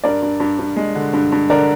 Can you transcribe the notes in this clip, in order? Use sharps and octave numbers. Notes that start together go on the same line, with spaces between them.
G2 A#4 D5
G2
G2
G2
G#3
D3
G2
G2
D3 A#4 D5